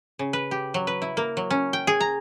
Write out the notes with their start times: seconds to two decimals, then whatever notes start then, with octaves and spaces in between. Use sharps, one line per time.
0.19 C#3
0.33 B4
0.51 G4
0.74 F#3
0.87 B4
1.02 E4
1.17 A#3
1.37 F#3
1.51 C#4
1.73 G5
1.87 G#4
2.00 A#5